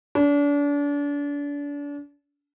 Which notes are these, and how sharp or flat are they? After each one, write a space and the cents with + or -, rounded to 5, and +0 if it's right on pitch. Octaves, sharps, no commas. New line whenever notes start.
D4 -35